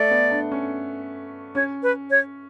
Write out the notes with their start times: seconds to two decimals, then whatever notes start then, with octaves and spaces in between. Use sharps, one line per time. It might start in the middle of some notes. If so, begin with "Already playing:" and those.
Already playing: A3 D5
0.11 B3
0.31 D4
0.52 C#4
1.55 C#4 C#5
1.83 B4
2.10 C#5